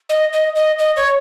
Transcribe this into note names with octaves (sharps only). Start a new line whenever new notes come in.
D#5
D#5
D#5
D#5
C#5